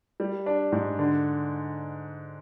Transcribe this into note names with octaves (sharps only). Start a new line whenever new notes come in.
G3
D4
G#2
D3